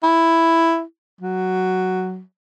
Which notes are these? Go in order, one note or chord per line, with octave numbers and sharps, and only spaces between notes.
E4
F#3